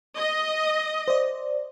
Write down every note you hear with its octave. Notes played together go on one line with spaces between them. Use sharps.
D#5
C5 D5